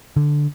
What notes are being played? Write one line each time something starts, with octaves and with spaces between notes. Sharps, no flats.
D3